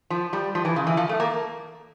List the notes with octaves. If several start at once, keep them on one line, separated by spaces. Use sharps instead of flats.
F3
G3
F3
E3
C#3
E3
F3
A3
A#3